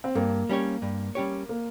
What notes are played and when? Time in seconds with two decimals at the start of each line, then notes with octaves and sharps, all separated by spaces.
0.04 C4
0.15 G2 A#3
0.49 G3 C#4 G4 C#5
0.82 G2
1.15 G3 C#4 G4 C#5
1.49 A#3